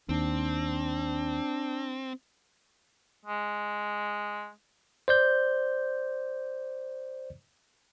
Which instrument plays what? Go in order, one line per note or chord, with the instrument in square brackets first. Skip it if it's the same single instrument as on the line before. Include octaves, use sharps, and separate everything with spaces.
[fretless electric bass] D#2 [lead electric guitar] C4 [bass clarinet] D4
[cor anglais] G#3
[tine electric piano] C5 D5 G6